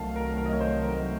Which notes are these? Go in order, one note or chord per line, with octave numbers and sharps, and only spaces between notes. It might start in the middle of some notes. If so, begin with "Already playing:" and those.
Already playing: C2 C3 D#3 F#3 A3 F5 A5
A#4
A#4
D#5
C#5
C5
A#4